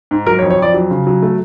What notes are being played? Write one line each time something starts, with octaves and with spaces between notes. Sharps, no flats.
G#2
F#3 A#4
C#5
F2
C#5
F2 D5
F#3
C#3
F#3
A3